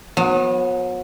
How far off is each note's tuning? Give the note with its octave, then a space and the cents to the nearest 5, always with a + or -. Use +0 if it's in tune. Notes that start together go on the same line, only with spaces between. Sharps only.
F#3 -35 B3 +0